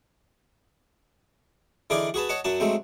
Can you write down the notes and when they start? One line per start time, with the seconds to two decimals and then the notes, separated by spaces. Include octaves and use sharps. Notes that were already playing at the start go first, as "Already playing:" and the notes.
1.90 D3 E3 D#4 G#4 A#4 D5
2.14 F#4 G#4 B4 A5
2.29 C#5 D#5 F#5 A5
2.44 F#2 F#3 F#4 A5
2.60 F#3 G#3 A3 C4